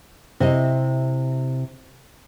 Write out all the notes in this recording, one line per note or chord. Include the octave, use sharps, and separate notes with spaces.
C3 E4 D#5